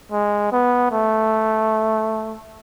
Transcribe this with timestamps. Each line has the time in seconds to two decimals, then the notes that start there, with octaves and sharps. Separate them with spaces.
0.12 G#3
0.52 B3
0.92 A3